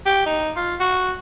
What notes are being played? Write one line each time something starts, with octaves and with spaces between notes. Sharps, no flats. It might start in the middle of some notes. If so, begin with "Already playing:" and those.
G4
D#4
F4
F#4